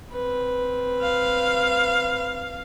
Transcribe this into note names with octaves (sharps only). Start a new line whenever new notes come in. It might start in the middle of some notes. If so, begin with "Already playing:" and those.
C4 B4
F5